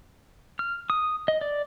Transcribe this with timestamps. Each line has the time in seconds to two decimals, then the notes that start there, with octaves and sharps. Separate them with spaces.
0.59 F6
0.90 D#6
1.28 D#5
1.41 D5